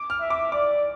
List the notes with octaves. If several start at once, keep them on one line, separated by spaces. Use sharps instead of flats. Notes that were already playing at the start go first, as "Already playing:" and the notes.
Already playing: D6
F6
E5
D6
D5 D6